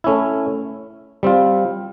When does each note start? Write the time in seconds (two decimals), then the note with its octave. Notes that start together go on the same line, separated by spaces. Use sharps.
0.04 A3 C#4 E4
1.23 G3 C4 F4